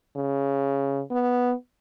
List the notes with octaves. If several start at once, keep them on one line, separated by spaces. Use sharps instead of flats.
C#3
B3